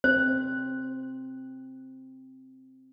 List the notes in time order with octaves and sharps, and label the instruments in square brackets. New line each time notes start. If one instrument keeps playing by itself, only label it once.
[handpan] C4 [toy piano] C5